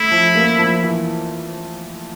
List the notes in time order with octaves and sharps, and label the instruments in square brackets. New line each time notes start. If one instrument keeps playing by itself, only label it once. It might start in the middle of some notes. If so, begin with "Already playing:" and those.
Already playing: [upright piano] A3 [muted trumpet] E4
[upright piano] F2
A#3
F2
E3